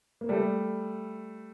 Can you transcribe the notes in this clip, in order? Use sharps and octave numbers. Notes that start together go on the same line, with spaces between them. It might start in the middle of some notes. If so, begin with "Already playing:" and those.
A#3
G3 A3